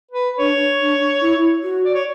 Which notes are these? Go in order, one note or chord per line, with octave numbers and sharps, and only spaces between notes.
B4
D4 C#5
D4
E4
F#4
D5
C#5